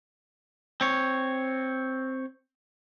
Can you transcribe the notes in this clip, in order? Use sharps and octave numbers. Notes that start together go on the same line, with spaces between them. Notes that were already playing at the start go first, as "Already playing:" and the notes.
C4 C#5